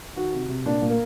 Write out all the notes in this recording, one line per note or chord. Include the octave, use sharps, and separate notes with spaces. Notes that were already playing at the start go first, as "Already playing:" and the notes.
D#3 F#4
C3
C3
A#2 D4
A#2
A#3